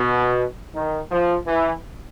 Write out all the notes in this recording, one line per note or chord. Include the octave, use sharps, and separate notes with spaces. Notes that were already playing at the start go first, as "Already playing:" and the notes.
Already playing: B2
D#3
F3
E3